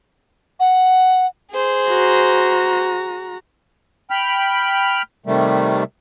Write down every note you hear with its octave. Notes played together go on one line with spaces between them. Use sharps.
F#5
G#4 C5
F#4 A#5
G5 B5 F6
C3 D#3 G3 A3